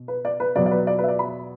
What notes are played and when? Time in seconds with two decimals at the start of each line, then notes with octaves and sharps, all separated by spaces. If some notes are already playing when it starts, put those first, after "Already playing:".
Already playing: B2
0.08 B4
0.25 D5
0.40 B4
0.55 E2 B2 F#3 B3 D5
0.66 D5
0.71 B4
0.87 D5
0.98 B4
1.03 E5
1.08 D5
1.19 B5